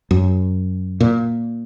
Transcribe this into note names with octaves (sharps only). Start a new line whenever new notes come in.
F#2
A#2